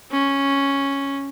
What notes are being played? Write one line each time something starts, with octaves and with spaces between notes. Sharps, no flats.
C#4